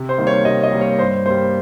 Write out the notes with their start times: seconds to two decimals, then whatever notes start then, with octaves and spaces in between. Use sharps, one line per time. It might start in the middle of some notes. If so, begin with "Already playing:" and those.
Already playing: C3
0.09 C5
0.18 D#3 G3 A#3
0.27 C#5
0.45 C3 D#5
0.63 D#5
0.72 D#3 G3 A#3
0.81 C#5
0.99 G2 C5
1.26 G3 A#3 C5